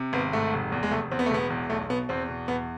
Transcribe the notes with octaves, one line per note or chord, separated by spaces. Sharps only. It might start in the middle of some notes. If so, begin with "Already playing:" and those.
Already playing: C3
G#1 B3
G#2 A3
F1
E2
G#3
F1 A3
E2 C4
B3
A3
E1 B3
E2
B1 A3
B2 B3
E2 C4
B2
E2 B3